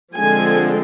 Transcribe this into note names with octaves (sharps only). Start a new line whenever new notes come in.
D3 F3 G#3 C4 G#5